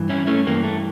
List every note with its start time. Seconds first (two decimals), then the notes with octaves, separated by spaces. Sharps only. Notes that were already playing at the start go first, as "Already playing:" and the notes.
Already playing: G2 E3
0.09 C#4 E4
0.27 A3 C#4
0.46 G2 E3 A#3
0.64 A3